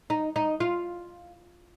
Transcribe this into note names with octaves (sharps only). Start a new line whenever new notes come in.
D#4
D#4
F4